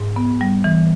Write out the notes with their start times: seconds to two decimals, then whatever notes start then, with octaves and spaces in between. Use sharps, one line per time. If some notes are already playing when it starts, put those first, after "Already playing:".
Already playing: G#2
0.16 B3
0.41 G3
0.64 E3